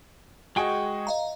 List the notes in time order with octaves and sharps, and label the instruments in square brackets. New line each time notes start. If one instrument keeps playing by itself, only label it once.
[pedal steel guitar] G#3 G5 C#6 [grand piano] F#4 G#4 D#5
[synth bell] D#5 F5 A#5